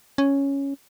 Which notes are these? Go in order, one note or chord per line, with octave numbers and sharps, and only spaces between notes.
C#4